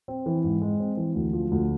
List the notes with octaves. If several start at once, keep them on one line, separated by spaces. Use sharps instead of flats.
C4
E3
G#2
G#3
C4
E3
D2
F3
D2